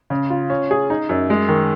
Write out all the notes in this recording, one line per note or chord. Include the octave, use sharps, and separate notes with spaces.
C#3
F4
C#4
G#4
D#4
F#2
G#3
D#3